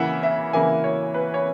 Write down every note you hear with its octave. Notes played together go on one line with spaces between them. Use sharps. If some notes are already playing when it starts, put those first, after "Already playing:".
Already playing: C#3 E3 A#3 E4 E5 F#5
E5
C#3 E3 A#3 E4 G#5
C#5
B4
C#5